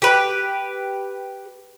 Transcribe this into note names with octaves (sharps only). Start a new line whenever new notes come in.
G4 B4